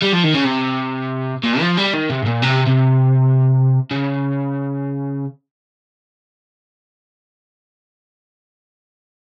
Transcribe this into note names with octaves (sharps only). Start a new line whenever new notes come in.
G3
F3
D#3
C#3
C3
A#2
F3
G3
D#3
C3
G#2
A#2
C3
C3
C#3